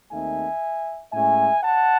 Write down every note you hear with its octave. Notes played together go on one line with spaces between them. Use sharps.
D#2 D#3 A3 C4 D#4 E5 G#5
A2 G#3 C#4 E4 E5 G#5
F#5 A5